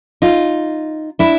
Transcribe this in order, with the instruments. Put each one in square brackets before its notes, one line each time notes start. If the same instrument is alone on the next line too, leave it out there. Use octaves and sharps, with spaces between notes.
[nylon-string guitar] D#4 F4
D4 E4